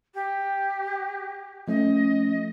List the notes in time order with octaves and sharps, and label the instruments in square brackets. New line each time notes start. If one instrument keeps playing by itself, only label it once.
[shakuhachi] G4
[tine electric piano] F3 A3 C#4 [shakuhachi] D#5